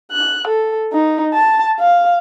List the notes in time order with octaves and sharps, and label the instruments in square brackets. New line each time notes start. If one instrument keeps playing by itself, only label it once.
[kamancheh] F#6
A4
D#4
A5
F5